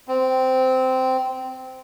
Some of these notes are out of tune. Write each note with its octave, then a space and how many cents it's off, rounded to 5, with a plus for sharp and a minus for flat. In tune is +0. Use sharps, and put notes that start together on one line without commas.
C4 -15